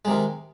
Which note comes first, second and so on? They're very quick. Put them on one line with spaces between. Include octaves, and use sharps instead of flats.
G#3 C3 D#3